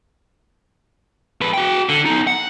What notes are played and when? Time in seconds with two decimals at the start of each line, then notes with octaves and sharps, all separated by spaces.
1.41 F2 B4
1.54 F#4 G5
1.89 D3
2.06 B3 D#4
2.27 F#5